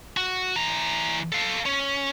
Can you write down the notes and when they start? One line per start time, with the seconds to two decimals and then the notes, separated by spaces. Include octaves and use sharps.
0.17 F#4
0.56 E3 A#5
1.32 A4 F5
1.66 C#4